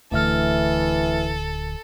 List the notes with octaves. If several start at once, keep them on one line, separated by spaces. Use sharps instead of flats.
D1 D3 E3 A3 A4 E5 F6